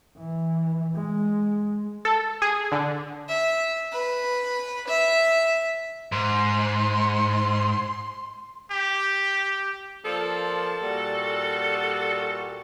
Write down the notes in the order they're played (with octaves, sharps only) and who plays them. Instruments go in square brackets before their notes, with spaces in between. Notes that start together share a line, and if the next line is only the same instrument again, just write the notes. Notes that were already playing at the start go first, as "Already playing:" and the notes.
[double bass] E3
G#3
[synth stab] A4
G#4
D3
[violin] E5
B4
E5
[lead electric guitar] G#2 [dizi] C6
[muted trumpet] G4
[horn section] F3 A#3 D5 [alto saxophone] A4
[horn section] A#2 G3 F#4